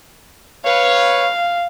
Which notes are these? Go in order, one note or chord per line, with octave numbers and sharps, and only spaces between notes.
B4 C#5 F5